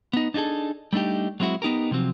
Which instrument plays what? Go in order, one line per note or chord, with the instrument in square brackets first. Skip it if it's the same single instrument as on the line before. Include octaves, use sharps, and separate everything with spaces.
[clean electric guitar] B3 D#4
D4 D#4 F4 G#4 A4
G3 A3 D4 D#4 G4
F#3 G#3 C4 E4 F#4
B3 D#4 G4 A#4
C3 F3 F#3 C4